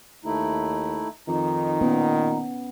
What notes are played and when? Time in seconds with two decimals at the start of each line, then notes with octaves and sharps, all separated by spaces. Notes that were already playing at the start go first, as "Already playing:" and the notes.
0.25 D#2 A3 D#4 E4
1.28 F2 D#3 D#4
1.81 A#2 B3 C#4